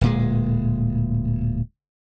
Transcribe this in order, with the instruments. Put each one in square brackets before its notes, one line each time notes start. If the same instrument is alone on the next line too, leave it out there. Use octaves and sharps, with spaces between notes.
[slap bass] D1 A#2 G#3